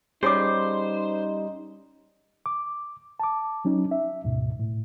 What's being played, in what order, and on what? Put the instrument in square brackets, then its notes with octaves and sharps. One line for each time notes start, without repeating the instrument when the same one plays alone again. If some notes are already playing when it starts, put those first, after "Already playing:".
[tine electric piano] G3 C#4 [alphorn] D#4 [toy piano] G#4 C#5 D6 [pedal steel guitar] C5
[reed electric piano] D6
A5 D6
F#3 C#4 D#4
E5
D2 G#2 B2
A2